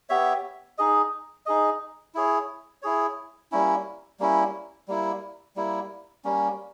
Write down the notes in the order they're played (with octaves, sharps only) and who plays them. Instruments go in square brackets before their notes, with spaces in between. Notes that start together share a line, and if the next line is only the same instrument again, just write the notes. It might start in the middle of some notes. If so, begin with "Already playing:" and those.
[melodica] B3 G4 C#5 E5
D#4 G#4 D#5
D#4 G#4 D#5
E4 G#4 C#5
E4 G#4 C#5
G3 A#3 C#4 E4
G3 A#3 C#4 E4
G3 A#3 E4
G3 A#3 E4
G3 A#3 C#4